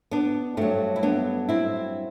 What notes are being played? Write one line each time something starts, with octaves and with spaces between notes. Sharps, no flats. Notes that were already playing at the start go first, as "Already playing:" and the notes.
B3 D4
G2 F#3 A3 C4
E4
B3 D4
C4 E4